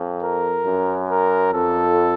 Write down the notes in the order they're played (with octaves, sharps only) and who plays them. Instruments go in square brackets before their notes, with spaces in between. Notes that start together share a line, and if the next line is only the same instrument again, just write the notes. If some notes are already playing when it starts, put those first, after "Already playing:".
Already playing: [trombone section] F2
[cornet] A#4
[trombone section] F#2
[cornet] A#4
[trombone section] F2 [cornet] A4